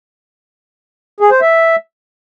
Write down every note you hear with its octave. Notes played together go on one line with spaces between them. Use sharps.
G#4
C5
E5